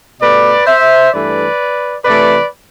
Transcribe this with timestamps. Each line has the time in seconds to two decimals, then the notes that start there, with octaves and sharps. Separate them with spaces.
0.20 B2 A3 B4 D5
0.66 C5 E5
1.12 G2 E3 A3 B4 D5
2.04 C3 E3 A3 B4 D5